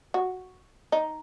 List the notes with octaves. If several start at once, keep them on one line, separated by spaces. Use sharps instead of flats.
F#4
D#4